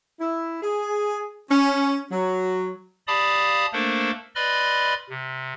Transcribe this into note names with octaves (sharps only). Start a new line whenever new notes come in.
E4
G#4
C#4
F#3
G4 D5 F5 A5 B5 D#6
A3 A#3 D4 A4 A#4 C5
B4 D5 D#5 B5 C6 F6
C3